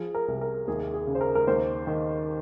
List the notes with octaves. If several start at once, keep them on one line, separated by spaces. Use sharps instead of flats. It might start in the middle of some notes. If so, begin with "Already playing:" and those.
Already playing: F3 G#4
A#4
C2
A#4
D#2 G#4
G#4
C#3
C5
A#4
A#4
D#2 C5
D#3